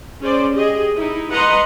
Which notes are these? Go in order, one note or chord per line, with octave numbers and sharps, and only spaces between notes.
C#4 G#4 C5 D5
G4 G#4 D#5
D#4 E4
B4 D#5 F#5 A#5 C6